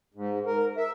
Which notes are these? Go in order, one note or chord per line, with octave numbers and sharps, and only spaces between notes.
G#2
A#4
E5